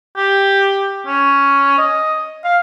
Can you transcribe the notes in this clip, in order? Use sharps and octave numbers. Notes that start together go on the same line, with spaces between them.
G4
C#4
D#5
F5